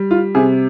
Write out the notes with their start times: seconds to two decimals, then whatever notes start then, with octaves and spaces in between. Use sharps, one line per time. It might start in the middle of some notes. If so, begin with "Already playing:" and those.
Already playing: G3
0.11 F4
0.35 C3 G#4